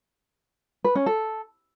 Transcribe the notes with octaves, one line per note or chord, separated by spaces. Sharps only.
B4
C#4
A4